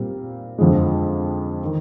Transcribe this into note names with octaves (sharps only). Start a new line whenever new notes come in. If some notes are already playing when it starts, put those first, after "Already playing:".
Already playing: A#2 G3 C4 F4
F2 D3 F3 G#3
D#3